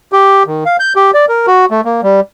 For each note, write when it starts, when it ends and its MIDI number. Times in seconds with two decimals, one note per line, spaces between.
0.12 0.43 67
0.47 0.64 51
0.66 0.77 77
0.80 0.93 91
0.96 1.11 67
1.14 1.25 74
1.29 1.46 70
1.47 1.65 66
1.71 1.81 57
1.85 2.01 58
2.03 2.20 55